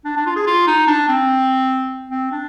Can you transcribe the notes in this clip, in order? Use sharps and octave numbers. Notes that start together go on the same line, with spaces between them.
D4
D4
F4
G#4
F4
D#4
D4
C4
C4
D4